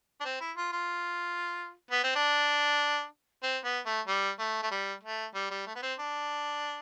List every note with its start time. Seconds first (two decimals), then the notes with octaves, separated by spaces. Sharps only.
0.21 D4
0.25 C4
0.41 E4
0.57 F4
0.72 F4
1.91 B3
2.04 C4
2.15 D4
3.43 C4
3.64 B3
3.86 A3
4.08 G3
4.39 A3
4.62 A3
4.71 G3
5.03 A3
5.35 G3
5.50 G3
5.66 A3
5.75 B3
5.82 C4
5.99 D4